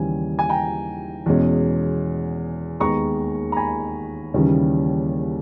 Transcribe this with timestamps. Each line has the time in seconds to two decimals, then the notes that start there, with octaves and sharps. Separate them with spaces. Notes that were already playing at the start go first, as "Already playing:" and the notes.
Already playing: D#2 C#3 E3 G3 G#5
0.39 G#5
0.49 G5 A#5
1.26 E2 B2 G#3 C#4
2.80 D#2 D#3 G#3 B3 A#5 C#6
3.52 A#5
3.57 G#5 B5
4.34 D#2 C#3 E3 G3 C#4